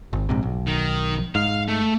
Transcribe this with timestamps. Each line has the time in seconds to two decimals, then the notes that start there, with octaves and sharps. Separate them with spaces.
0.13 G#1
0.29 A#1 G#2 C3
0.43 B1
0.67 D#3
1.35 G#2 F5
1.68 A3